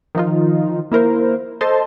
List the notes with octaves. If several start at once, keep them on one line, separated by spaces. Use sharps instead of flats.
D#3 F3 D#4 F4
A#3 E4 A#4 C5
A4 C5 D#5 A5 C6